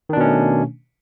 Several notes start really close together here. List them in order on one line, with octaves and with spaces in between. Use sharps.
D#3 D4 B2 C#4 A3